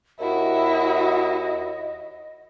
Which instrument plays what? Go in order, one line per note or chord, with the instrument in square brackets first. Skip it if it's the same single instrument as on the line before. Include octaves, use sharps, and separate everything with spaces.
[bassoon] D#2 [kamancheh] E4 F#4 [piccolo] D#5